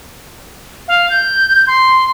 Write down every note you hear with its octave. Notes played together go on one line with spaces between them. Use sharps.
F5
G6
C6